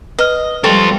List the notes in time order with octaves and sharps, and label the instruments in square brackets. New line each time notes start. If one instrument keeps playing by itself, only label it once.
[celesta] B4 F6 [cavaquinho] D#5
[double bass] G3 [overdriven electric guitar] C4 F4 [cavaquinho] A4 C#6